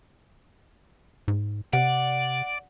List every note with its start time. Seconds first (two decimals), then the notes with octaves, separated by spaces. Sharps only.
1.28 G#2
1.73 C3 D5 F#5